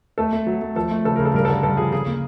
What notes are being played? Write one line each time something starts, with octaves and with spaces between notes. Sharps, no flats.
A3 A4
A3
F#3
A3
F3 A4
A3
C#3 A4
C#3 A#4
A4
G2 A#4
D3 A4
G2 A4
F3 G#4
C#3 G#4
A#3